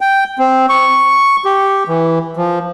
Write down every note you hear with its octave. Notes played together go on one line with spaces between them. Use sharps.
G5
C4
C#6
G4
E3
F3